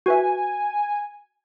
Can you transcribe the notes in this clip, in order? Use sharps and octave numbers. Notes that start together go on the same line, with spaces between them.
F#4 B4 E5 G#5